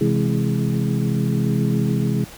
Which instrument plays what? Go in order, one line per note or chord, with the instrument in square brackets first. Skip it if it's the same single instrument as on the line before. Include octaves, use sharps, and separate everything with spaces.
[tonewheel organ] C3 E3 G#3